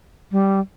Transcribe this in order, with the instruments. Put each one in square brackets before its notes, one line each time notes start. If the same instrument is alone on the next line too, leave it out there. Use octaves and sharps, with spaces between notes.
[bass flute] G3